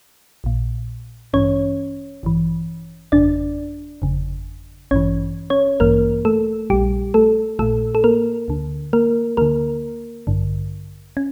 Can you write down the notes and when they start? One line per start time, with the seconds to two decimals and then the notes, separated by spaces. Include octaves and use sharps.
0.44 A#1 A#2
1.33 A1 G2 E3 C#4 C#5
2.23 A1 G2 E3
3.12 G1 F2 C#3 D4 D5
4.02 G1 F2 C#3
4.91 A1 G2 E3 C#4 C#5
5.50 C#4 C#5
5.80 A1 G2 E3 A#3 A#4
6.25 A3 A4
6.70 A#1 A#2 G3 G4
7.14 A3 A4
7.59 A#1 A#2 A3 A4
7.95 A4
8.04 A#3 A#4
8.48 D2 D3
8.93 A#3 A#4
9.37 D2 D3 A#3 A#4
10.27 A1 G2 D3
11.17 C#4